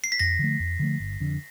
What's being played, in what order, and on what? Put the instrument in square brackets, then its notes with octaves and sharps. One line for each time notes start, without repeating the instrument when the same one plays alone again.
[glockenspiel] C7
B6
[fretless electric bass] F2 [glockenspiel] A#6
[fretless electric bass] D3 F3 A3
F2
D3 F3 A3
G1
F2 D3